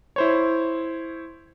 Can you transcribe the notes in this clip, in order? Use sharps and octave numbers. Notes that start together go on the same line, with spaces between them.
E4 C5 C#5